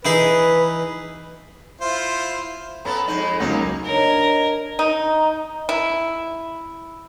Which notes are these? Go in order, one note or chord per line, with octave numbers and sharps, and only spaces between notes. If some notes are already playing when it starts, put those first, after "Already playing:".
E3 D#4 G#4 B4
E4 F4 C5
B3 C#4 A4 A#5 B5
F2 G#3 D#4
C#2 F#3 A#3 C#4 D#4
D4 A#4 C#5 D#5
D#4
E4